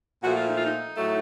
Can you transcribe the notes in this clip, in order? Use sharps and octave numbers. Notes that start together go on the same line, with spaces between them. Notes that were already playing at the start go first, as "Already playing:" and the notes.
A#2 F3 A3 F#4
F4
D#4
F4
D#4
A2 F#3 A3